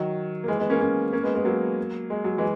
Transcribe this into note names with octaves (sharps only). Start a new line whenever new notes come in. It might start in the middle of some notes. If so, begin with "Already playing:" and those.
Already playing: D#3 F#3
A#3
E3 G#3
G#3 B3
A#3 C#4
A#3 C#4
A#3 C#4
G#3 B3
G#3 B3
F#3 A#3
G#3
F#3
E3 G#3